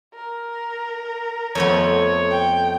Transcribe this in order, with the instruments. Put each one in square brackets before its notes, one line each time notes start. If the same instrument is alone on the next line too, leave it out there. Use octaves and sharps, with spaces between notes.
[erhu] A#4
[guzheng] F2 A3 B3 [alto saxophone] C#5
[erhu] G5